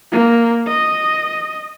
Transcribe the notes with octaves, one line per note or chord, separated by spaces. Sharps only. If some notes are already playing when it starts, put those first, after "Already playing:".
A#3
D#5